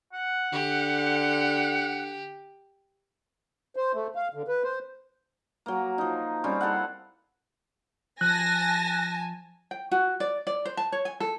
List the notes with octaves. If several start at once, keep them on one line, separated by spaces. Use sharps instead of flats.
F#5
D3 G4
C5
A3
F5
D3
B4
C5
F#3 A#3
F3 D#4
G3 C4 C#4
E4 A4 F5 F#5
F3 G#5 A5 F#6 A#6
G5
F#4
D5
D5
C5
A5
C#5
G#5
A4